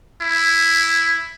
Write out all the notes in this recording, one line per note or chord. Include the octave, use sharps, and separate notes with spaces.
E4